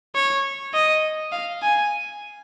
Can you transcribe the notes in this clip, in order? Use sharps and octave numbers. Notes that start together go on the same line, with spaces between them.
C#5
D#5
F5
G#5